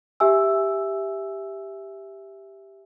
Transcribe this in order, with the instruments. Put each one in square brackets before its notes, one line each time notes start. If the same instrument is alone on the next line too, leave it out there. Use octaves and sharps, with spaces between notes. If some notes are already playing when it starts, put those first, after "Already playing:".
[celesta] G4 E5 G#5 E6